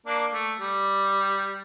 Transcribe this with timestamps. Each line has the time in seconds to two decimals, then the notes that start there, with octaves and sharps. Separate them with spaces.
0.06 A#3 D4
0.34 A3
0.59 G3